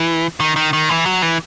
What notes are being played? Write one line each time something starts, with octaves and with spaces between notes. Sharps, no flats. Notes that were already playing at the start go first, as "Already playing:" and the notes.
Already playing: E3
D#3
D#3
D#3
E3
F#3
E3